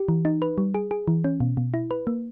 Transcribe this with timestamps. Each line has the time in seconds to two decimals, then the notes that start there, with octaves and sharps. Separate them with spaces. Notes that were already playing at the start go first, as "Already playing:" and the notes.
Already playing: G4
0.09 E3
0.25 D#4
0.42 B4
0.58 G3
0.74 G#4
0.91 G#4
1.08 E3
1.24 C#4
1.40 B2
1.57 B2
1.74 E4
1.91 B4
2.07 A#3